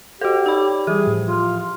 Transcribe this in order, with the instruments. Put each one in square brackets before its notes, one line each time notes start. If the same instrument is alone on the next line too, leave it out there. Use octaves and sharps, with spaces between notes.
[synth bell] F#4 A4 [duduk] G4 [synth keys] C5 F5 F#6
[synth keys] D#4 C#5 D5 [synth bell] G5 B5
[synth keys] E3 G3 [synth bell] G4 [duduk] G#4
[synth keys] A2 E3 F3
[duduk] F4